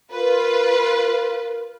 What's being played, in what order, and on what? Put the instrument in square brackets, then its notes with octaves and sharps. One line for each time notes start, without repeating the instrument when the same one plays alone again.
[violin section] F4 B4 [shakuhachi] A#4